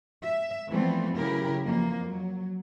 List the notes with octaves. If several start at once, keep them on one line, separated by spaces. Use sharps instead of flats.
E5
E3 F3 G3 A3 B3 C4
C#3 E3 F#3 E4 G4 A#4
F2 E3 A#3
F#3